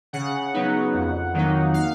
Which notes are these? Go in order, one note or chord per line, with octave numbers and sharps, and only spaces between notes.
C#3 F#5
F#3 B3 D#4
F2
D#3 F#3 A#3 D#4
F5